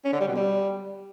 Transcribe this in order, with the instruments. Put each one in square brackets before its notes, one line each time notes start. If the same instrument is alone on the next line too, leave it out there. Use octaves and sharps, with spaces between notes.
[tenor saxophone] C#4
D3
G3
B2
G3